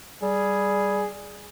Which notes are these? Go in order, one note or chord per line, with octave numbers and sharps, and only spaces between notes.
G3 G#4